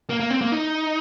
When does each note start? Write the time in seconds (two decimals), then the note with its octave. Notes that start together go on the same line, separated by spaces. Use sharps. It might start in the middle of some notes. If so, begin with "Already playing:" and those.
0.09 A#3
0.20 A#3
0.31 C4
0.41 A#3
0.52 D#4